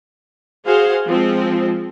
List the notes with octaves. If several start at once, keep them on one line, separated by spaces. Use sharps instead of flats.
F#4 G#4 C5 F5
F3 G#3 C4